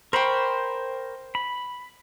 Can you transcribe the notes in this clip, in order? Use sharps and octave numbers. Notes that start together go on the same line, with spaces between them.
A#4 C5 G5 B5 C#6
B5